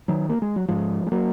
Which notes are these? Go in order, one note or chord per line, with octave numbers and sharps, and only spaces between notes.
D#3 F#3
A#3
G#3
F#3
G#2 F3 G#3
G#3
F#3 A#3